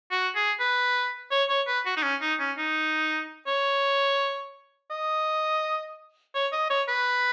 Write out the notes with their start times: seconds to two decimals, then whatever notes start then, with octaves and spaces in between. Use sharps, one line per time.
0.12 F#4
0.36 G#4
0.60 B4
1.32 C#5
1.49 C#5
1.67 B4
1.86 F#4
1.97 D#4
2.03 C#4
2.22 D#4
2.40 C#4
2.58 D#4
3.47 C#5
4.91 D#5
6.35 C#5
6.53 D#5
6.70 C#5
6.88 B4